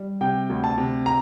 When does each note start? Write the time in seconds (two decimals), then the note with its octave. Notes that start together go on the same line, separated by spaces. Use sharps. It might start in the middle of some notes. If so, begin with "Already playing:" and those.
Already playing: G3
0.21 C3 G5
0.50 D2
0.64 A5
0.78 C3
1.06 A#5